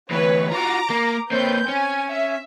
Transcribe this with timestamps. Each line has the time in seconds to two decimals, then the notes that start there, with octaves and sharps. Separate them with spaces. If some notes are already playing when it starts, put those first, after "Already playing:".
0.11 D2 E3 B4 C#5
0.52 F4 F#4 A#5 D6
0.90 A#3
1.31 A#3 C4 B4 C#5 G6
1.68 C#4 G#5
2.13 E5